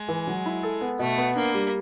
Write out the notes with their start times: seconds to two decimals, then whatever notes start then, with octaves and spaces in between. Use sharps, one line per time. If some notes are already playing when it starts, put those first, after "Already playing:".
Already playing: G#3
0.08 E3
0.27 F#3
0.46 E4
0.63 A4
0.81 B3
0.99 B2 A3
1.18 B3
1.35 A#3 D4
1.54 G3